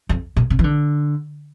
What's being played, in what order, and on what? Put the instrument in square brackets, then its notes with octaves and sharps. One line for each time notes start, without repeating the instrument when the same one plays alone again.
[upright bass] F2
A#2
C3
E3
D3